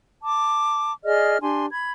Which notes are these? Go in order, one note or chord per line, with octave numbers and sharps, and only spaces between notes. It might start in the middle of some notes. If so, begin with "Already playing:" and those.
A5 D6
G#4 D5 D#5 F6
D4 G4 G#5 C6
B5 G#6